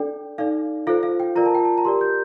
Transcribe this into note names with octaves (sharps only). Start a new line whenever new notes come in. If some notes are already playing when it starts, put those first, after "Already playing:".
Already playing: D4 A4 D5 G5
D#4 A4 D5 F5
F4 A4 C5 F5
F5
G5
F4 A#4 D5 A#5
A5
G5
A5
A#5
G4 A#4 D5 C6
G6